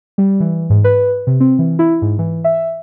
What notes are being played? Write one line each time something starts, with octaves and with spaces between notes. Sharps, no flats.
G3
E3
G#2
B4
C3
C4
E3
E4
G#2
E3
E5